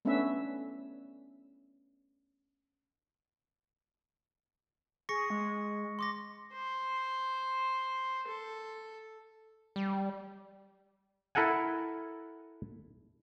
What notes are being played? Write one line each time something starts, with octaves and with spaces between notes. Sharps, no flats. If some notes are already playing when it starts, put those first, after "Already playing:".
A3 B3 C#4 D4 B4 E5
G#4 C#6 A#6 C#7
G#3
C6 D6 A#6
C5
A4
G3
E4 A4 A#4 F#5 G#5